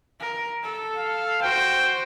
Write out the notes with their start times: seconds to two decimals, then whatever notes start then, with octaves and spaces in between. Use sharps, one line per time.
0.20 A#4
0.63 A4
0.97 F5
1.42 F#4 C5 G5